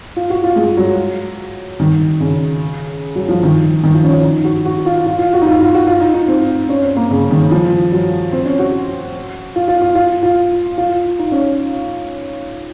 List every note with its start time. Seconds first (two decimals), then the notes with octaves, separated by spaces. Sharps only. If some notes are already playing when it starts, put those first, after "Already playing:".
0.16 F4
0.30 F#4
0.44 F4
0.56 G#3
0.77 F#3
1.80 D#3
2.20 C#3
3.15 F#3
3.29 F3
3.43 D#3
3.84 D#3
3.94 F3
4.04 C#4
4.24 D#4
4.44 F#4
4.65 F#4
4.86 F4
5.06 F4
5.19 F4
5.33 F#4
5.42 D#4
5.47 F4
5.61 F4
5.74 F#4
5.87 F4
6.01 D#4
6.14 D#4
6.28 C4
6.69 C#4
6.82 C4
6.97 A#3
7.11 C#3
7.30 D#3
7.51 F3
7.92 F#3
8.33 C4
8.46 C#4
8.59 F#4
9.56 F4
9.68 F4
9.82 F4
9.95 F4
10.23 F4
10.78 F4
11.19 D#4
11.32 C#4